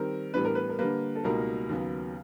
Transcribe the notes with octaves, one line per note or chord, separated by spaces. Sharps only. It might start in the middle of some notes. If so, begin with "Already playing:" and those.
Already playing: D#3 G3 C4 A#4
A2 E3 G3 B3 D4 B4
A#4
B4
A#4
D3 G3 A#3 B4
A4
C#2 B2 G3 A#3 D#4 A#4
D#2 C#3 F#3 B3